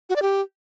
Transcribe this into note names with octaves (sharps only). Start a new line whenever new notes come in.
F#4
D5
G4